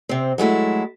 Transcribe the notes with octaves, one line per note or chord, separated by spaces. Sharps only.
C3 C4
F#3 G#3 A3 E4